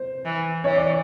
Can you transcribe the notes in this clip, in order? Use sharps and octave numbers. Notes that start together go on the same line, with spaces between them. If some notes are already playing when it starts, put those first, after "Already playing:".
Already playing: C5
E3
E3 C#5
D5